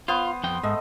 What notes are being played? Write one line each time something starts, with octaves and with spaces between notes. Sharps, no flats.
B3 F4 C5
F2 G5
G#2 A3 D#5